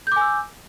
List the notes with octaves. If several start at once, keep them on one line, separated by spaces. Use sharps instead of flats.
G#5 D6 E6 G6